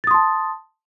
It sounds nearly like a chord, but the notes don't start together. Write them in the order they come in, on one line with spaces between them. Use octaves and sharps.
A6 D#6 C6 A5